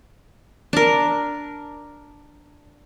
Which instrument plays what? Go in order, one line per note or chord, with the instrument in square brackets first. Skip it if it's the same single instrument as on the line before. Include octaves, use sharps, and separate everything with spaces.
[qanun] D4 A#4